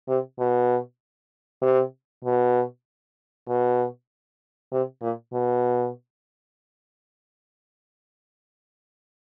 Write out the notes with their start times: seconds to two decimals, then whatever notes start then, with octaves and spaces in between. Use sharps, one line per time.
0.08 C3
0.39 B2
1.62 C3
2.24 B2
3.48 B2
4.72 C3
5.02 A#2
5.33 B2